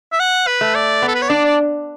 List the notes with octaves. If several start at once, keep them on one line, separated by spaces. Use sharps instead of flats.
E5
F#5
B4
A3
D5
B3
A4
B4
C#5
D4 D5
D5